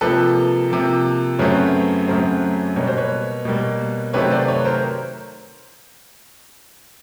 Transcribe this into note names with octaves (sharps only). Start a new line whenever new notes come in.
C3 F3 A#3 A4 B4
C3 F3 A#3
F#2 C#3 F#3 A3 C4 B4 C#5
F#2 C#3 F#3 A3 C4
B2 G3 A#3 C#5
C5
B4 C#5
B2 G3 A#3
C3 D#3 F#3 A3 C4 B4 C#5
C5 D5
B4 C#5
A#4 C5